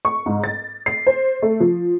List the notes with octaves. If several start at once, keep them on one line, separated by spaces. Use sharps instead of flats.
C#6
G#2
A6
C7
C5
A3
F3